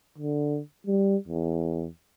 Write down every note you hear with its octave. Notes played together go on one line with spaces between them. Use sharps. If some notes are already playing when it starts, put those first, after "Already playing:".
D3
G3
E2